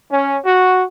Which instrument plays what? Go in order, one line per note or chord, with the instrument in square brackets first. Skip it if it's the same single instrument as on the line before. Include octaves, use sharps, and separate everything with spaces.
[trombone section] C#4
F#4